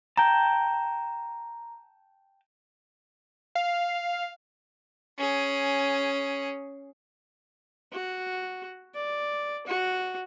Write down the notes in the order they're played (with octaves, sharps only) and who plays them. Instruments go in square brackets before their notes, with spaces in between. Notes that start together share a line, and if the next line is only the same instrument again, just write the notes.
[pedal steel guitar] G5 A5 [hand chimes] A#5
[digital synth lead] F5
[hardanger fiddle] C#4 G#4
[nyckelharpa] F#4
D5
F#4